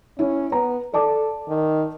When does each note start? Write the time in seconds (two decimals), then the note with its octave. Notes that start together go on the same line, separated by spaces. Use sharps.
0.19 C#4 E4
0.52 B3 A#5
0.94 A4 D5 A5 D6
1.49 D#3